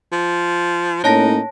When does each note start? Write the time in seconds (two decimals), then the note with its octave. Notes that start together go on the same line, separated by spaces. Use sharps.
0.12 F3
1.04 A2 A#3 C#4 D#4 C#5 A5 A#6